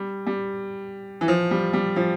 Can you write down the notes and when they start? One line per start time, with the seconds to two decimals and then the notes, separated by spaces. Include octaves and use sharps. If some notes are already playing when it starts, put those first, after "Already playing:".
Already playing: G3
0.27 G3
1.21 E3
1.28 F3
1.51 G3
1.73 G3
1.96 F3